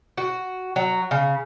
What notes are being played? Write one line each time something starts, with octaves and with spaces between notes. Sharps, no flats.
F#4
F#3
C#3